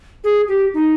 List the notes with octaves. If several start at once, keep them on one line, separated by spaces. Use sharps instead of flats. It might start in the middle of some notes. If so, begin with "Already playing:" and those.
G#4
G4
D#4